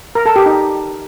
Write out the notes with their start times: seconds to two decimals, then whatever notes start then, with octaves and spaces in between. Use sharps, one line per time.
0.15 A#4
0.26 A4
0.36 G4
0.46 D#4